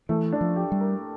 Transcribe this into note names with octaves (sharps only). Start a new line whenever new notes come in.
E3 A3
D4
F3
G4
G3
A#4